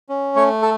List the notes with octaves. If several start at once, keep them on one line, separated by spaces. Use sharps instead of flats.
C#4
A3 C#5
A4